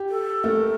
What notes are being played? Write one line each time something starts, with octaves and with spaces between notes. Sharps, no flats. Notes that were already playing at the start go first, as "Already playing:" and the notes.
Already playing: G4
A4
A3 A#4